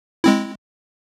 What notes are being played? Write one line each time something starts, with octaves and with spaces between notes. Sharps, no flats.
G#3 C4 E4